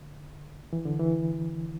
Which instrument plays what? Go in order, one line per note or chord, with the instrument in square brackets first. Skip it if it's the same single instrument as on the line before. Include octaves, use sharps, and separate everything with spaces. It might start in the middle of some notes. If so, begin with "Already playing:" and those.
Already playing: [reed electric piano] D3
E3
D3
E3